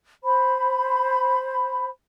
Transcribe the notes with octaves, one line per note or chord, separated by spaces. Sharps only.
C5 B5